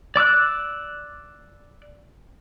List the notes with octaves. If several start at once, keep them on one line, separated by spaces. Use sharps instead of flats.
D5 D6 E6 F#6